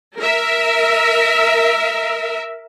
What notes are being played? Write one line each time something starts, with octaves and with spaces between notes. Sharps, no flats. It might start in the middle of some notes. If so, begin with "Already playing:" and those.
A#4 E5